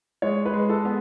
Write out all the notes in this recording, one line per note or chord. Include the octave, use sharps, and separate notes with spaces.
G#3 C#5
B4
G#3
A4
B3